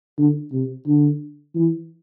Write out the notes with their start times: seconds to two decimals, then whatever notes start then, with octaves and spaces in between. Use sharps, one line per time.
0.18 D3
0.52 C3
0.87 D3
1.55 E3